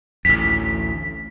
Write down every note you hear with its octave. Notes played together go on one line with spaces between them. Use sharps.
A1 D2 B6